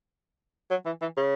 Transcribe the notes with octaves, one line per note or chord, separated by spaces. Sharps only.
F#3
E3
E3
C#3